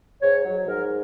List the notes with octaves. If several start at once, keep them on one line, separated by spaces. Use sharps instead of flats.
G#2 C#5
F#3
G#2 A#4